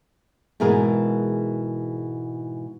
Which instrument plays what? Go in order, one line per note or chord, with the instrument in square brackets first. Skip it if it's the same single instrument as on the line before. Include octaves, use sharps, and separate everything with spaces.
[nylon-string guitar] G#2 B2 E3 G#4 A#4